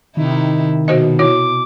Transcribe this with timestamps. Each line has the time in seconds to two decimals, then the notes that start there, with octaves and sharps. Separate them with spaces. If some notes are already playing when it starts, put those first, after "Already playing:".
0.17 C3 D#3 D#4 E4
0.88 B2 F#4 C5 D#5
1.19 E4 F#4 C#5 D6